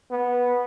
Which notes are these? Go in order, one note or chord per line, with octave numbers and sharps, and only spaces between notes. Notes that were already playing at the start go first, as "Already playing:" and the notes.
B3